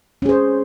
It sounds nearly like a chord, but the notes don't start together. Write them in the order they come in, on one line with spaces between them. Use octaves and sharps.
C#4 G#4 C5